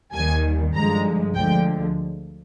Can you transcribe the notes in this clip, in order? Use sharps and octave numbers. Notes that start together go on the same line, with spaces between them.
D#2 D#3 G3 G#5
G2 D3 F3 G#3 A#5
D2 D3 F3 G#3 G5